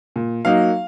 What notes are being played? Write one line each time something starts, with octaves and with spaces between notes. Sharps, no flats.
A#2
F#3 A#3 D#4 F5